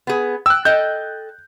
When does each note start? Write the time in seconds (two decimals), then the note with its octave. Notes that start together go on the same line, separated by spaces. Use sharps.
0.07 B3 G#4
0.46 G5 E6 F#6
0.65 A4 D#5 G5 G6